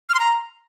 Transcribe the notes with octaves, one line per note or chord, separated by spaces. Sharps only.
F6
C6
A#5